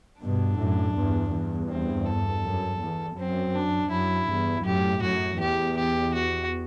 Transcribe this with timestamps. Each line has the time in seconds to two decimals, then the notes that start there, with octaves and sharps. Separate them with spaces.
0.21 G2 B2 D4
0.58 F#2 A2
0.96 E2 G2
1.32 E2 G2
1.70 C4
2.06 A4
2.43 F#2
2.80 E2
3.17 F#2 C4
3.54 D4
3.91 F#2 E4
4.28 E2 G2
4.65 F#2 A2 G4
5.02 F#2 F#4
5.40 E2 G4
5.77 G4
6.14 F#4